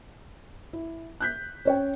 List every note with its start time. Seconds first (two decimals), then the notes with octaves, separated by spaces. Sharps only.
0.73 E4
1.21 F#6 G6 B6
1.65 C#4 C#5 G5